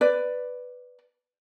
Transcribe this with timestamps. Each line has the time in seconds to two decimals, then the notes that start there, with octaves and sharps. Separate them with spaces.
0.01 B4 D5